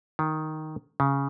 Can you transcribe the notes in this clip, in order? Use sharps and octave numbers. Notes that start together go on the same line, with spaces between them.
D#3
C#3